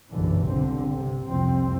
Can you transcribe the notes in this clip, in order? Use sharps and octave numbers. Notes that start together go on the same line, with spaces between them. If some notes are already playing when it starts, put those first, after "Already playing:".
F#1 B1 G2 D3 E3
G1 D3 C4
C3
C2 F2 C3 C4